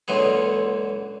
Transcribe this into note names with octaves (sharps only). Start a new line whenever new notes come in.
C#2 A#2 D3 E3 F#3 G#4